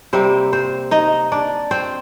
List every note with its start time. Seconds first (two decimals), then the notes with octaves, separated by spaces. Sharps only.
0.13 C3 G3 A#3 C4 C5
0.53 C4 C5
0.91 D#4 D#5
1.32 D4 D5
1.71 C4 C5